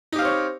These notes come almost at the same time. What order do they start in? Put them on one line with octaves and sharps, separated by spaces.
D#4 G4 F5 C4 C#5